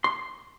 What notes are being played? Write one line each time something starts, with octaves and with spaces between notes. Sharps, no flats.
C6